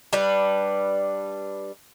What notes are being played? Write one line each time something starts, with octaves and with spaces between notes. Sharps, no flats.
G3 D4 B4